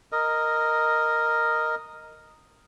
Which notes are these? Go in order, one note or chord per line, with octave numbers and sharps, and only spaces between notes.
A#4 D#5